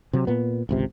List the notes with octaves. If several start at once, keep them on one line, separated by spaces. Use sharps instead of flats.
C3 F#3
A#2 B3
G#1 C#2 C3